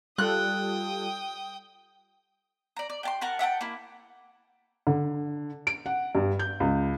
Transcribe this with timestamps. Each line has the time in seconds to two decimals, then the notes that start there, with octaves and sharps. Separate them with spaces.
0.18 G3 F4 A4 G5 D#6 F#6
2.77 D5 A#5
2.90 D5
3.03 G5 A5 C6
3.21 A#4 F#5 A5
3.39 E5 F#5 G5 A5
3.61 A#3 E4
4.87 D3
5.67 D7
5.86 F#5
6.15 G2
6.39 G6
6.60 C#2